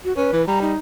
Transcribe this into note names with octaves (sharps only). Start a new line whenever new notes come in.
F#4
C#4 B4
E3
G3 A#5
D#4